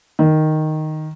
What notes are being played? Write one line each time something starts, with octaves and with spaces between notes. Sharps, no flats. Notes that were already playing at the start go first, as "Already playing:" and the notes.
D#3